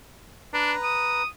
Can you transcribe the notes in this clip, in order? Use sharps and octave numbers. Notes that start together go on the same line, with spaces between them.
D4 B4 A#5
D#6